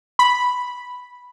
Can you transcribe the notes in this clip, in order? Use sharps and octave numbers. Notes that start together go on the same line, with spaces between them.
B5